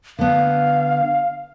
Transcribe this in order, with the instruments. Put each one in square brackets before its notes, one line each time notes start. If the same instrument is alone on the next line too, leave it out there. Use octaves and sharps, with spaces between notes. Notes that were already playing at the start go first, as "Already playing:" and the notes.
[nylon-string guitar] D3 B3 [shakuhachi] F5